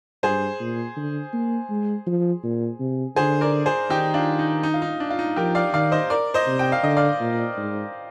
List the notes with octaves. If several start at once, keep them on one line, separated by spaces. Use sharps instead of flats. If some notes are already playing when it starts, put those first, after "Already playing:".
G2 G#4 C5
A#2
D3
A#3
G#3
F3
A#2
C3
D3 G#4 C5
A#4 D5
G#4 C5
D#3 D#4 G4
D4 F4
D#4
D#4
F4
D#4
D4
F4
D#4
F3 G4 A#4
D5 F5
D#3 D5 F5
C5 D#5
A#4 D5
C5 D#5
C3
G5
F5
D3 D#5
D5 F5
A#2
G#2